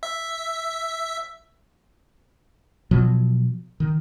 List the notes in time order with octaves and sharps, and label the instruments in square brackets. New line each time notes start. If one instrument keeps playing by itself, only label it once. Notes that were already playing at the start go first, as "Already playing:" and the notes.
[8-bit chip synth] E5
[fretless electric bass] B2 F3 F#3
D#3